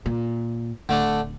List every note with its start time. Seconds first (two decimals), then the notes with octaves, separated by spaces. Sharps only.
0.06 A#2
0.89 D1 D3 A3 D4